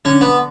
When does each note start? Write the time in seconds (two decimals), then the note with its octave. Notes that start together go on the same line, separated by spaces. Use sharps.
0.05 D3 C#4
0.21 B3